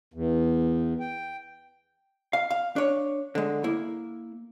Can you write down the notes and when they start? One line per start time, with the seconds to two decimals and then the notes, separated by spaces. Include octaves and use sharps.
0.14 E2
1.00 G5
2.33 F5
2.50 F5
2.76 D4 C#5
3.35 D3 G#3
3.64 A#3 E4